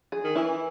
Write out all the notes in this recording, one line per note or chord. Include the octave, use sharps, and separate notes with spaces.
G#4
D#3
E3 E4